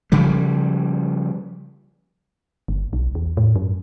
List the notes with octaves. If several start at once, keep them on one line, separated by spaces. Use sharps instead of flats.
C#3 F3 G3
G1
B1
E2
A2
F#2